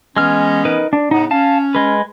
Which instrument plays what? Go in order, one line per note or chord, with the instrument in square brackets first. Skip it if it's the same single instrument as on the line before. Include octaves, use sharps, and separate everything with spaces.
[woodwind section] E3 B3 C#4 [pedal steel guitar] G#3 F6
[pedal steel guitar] D#4 A#4 B4
D4
[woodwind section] A2 C#3 B3 [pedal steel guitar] D#4
[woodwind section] C#4 [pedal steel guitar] F5 A5
[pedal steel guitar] G#3 B4